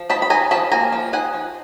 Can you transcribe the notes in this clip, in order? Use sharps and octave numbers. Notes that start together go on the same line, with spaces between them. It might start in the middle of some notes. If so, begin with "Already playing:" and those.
Already playing: F3
D#4 A5 B5
B5
D#4 G#5 A#5
F3 A5 B5
A#3 G#5 A#5
F3
D#4 F#5 G#5
F3